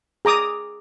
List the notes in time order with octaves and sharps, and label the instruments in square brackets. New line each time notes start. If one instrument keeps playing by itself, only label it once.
[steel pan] G#4 A#5 D6 D#6